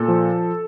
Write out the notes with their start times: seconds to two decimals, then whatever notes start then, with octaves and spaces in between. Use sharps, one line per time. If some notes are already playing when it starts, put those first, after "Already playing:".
Already playing: A#2 A4
0.08 F3